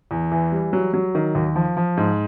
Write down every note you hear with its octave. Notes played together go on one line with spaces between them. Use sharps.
E2
E3
G3
F#3
F#3
D#3
D#2
F3
F3
G#2